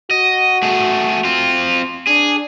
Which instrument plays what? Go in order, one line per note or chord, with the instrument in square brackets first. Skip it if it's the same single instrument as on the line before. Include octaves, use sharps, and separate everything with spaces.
[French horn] F#4 [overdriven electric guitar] D#5
[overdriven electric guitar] A3 G#4
C4 F4
[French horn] D4 [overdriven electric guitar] G#4